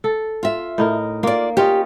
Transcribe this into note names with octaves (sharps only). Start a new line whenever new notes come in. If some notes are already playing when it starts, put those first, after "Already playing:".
A4
F4 E5
A2 D#4 A#4
A#3 F4 D5
C#4 F4 G4 D#5